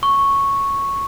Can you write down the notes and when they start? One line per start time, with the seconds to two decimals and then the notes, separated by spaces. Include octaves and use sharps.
0.03 C#6